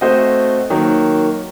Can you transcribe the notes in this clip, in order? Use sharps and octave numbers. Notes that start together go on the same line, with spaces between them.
A3 C4 F#4 C5 D#5
D#3 F#3 A#3